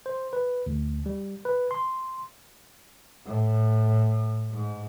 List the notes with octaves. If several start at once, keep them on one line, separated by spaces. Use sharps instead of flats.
C5
B4
D2
G3
B4
C6
A2
G#2